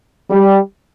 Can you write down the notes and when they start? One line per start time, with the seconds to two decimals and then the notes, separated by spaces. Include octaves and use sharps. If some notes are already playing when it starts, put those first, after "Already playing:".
0.30 G3